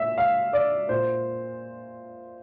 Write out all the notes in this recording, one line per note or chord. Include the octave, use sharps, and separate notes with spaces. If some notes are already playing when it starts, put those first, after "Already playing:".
Already playing: A#2 E5
F5
D5
A#2 C5